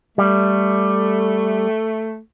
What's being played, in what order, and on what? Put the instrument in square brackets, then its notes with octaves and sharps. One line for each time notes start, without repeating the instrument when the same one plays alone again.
[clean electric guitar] G3 [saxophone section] A3